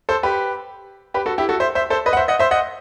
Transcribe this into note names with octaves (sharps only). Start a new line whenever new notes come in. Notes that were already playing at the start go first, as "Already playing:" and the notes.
A4 C5
G4 B4
G4 B4
F#4 A4
E4 G4
F#4 A4
C5 E5
C5 E5
A4 C5
B4 D#5
F#5
C5 E5
D#5 F#5
C5 E5
D#5 F#5